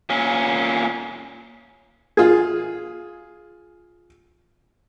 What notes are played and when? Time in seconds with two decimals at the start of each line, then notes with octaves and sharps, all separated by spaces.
0.10 A#2 C#4
2.17 F4 G#4